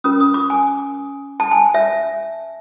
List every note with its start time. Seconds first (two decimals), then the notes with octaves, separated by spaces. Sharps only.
0.04 C#4 F4 A#4 D#6
0.20 D#6
0.34 D6
0.50 G#5
1.40 A5
1.51 G#5
1.74 E5